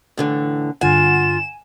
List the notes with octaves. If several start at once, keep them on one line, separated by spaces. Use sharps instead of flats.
A2 D3 E3
G2 D3 F4 F#5 G#5 E7